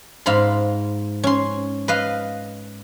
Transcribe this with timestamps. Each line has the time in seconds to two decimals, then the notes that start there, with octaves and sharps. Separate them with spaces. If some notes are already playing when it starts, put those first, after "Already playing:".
0.26 G#2 F5 B5 C6
1.24 C#4 C6
1.88 B4 D#5 F5